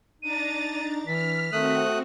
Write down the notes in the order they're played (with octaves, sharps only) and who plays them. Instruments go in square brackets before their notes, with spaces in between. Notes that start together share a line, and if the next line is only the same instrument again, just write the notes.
[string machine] D4 A#5 A6 [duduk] D#4 [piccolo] D#7
[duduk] E3 [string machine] F6 [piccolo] B6
[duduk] D#3 [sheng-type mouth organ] A3 D#6 F#6 [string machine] C4 F#4